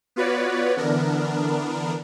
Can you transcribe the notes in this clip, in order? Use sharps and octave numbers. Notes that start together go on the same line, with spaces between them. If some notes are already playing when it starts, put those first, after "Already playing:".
B3 F4 F#4 B4 C#5 D5
D3 E3 B3 D4 A#4